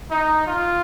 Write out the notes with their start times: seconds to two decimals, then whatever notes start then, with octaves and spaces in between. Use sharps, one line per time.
0.10 D#4
0.46 F4